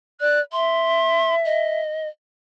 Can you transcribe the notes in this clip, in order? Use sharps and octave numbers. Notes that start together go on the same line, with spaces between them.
D5 F#6
E5 C6
D#5